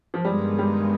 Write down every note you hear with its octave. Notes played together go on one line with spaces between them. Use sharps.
F3
G2 D#3 G3 G#3 B3
G3